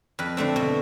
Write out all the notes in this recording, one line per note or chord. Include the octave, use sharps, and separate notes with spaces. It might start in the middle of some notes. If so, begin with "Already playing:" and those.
F2 B4
D3 A3 C4
B2